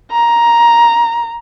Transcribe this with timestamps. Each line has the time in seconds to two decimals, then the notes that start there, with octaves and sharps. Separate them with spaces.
0.12 A#5